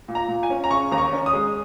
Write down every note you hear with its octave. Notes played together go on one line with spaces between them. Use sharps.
A#2
A#5
A#2
G#5
C#4
A#5
C#3 C#6
D#2 A#5
C#6
C#4
D#6
G#3